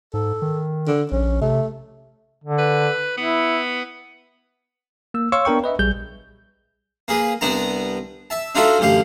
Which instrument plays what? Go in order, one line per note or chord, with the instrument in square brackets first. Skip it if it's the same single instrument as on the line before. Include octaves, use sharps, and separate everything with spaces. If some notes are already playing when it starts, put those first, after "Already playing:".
[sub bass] G#2 [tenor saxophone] A4
[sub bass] D#3
[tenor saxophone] D3
[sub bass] A#1 [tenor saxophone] C#4
[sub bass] C3 [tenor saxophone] A3
[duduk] D3
[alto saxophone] B4
[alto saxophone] B3 [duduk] E4
[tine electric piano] A#3 E6
C#5 F5 C6 C#6 E6
B3 D4 A#4 G5 C#6
B4 D#5 E5
A#1 G3 G#4 G6
[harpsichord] A#3 G#4 B4
C2 B3 D4 A5 A#5
E5 A5
D4 D#4 F4 F#4 A4 E5
A1 F#2 D3 G4 F5